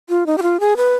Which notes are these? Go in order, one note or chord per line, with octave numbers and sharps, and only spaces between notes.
F4
D#4
G4
F4
G#4
B4